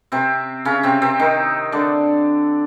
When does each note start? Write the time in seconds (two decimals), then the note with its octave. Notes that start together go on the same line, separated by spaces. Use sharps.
0.12 C3 C4
0.65 C#3 C#4
0.83 C3 C4
1.02 C3 C4
1.19 D#3 D#4
1.72 D3 D4